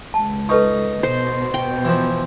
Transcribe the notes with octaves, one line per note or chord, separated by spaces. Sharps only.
C#2 A5
D#4 A4 B4 C#6
B2 C5
G5
E3 F3